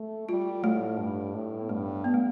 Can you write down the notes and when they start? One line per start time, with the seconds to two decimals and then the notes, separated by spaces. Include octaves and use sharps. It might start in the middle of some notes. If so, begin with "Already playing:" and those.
Already playing: A3
0.29 G3 F4
0.64 A2 A3
0.99 G2
1.35 A2
1.60 B3
1.69 G2 A3
2.04 B3
2.14 A3